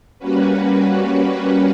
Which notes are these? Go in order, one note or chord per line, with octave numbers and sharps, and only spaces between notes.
G3 A#3 C#4 F#4 B4